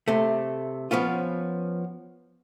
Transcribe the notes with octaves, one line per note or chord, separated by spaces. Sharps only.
C3 A3
F3 B3 C#4 F4